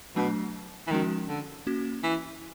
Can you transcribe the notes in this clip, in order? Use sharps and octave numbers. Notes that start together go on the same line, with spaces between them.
B2 F#3 A3 D4
E3
D#3 F3 G#3 C#4 F#4
D3
A#3 C#4 F#4
E3